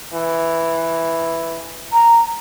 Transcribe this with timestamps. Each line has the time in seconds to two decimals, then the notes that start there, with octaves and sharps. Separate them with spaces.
0.13 E3
1.93 A#5